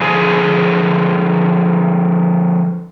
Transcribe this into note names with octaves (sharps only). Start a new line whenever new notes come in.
D3 F3 G#4 G#5